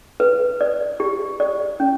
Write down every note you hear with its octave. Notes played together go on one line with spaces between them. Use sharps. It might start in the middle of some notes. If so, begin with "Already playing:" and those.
B4
D5
G4
D5
C#4